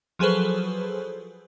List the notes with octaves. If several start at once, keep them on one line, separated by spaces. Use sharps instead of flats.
F3 F#3 G#4 A4 B4 C5